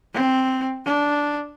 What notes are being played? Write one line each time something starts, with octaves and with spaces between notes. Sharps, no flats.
C4
D4